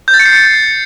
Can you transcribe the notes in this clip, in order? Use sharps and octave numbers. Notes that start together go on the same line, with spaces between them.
G6
A6
C#7
C7